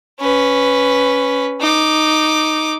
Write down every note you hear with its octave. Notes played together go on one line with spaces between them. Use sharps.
C#4 B4
D#4 D6